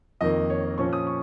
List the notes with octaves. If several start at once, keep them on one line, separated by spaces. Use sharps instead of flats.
F2 D#3 A#3 D#5
C#5
C#5
A#2 F3 C#4 C#6
D#6
C#6